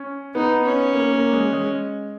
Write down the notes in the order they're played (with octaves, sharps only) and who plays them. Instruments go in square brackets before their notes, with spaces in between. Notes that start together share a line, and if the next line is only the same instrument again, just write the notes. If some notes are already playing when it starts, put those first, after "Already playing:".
Already playing: [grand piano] C#4
[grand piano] B3 [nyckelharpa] D#4
[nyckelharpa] C#4
[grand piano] A#3
A#3
G#3
G#3